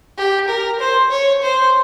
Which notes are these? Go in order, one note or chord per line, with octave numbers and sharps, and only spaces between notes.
G4
A#4
C5
C#5
C5